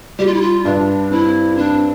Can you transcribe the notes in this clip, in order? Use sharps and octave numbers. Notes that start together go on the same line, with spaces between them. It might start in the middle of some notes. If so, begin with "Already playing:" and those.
G3 G4
F4
E4
F4
G2 D4
C4 E4
C4 D4